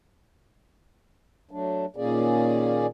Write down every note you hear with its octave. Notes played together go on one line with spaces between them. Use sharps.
F#3 A3 D4
A#2 D#3 A#3 C#4 G#4 D5